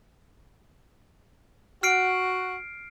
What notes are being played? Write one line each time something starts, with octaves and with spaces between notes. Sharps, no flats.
F#4 F6 C7 D7